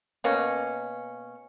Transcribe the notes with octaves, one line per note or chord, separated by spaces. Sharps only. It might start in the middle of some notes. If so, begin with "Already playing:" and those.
B2 A#3 C#4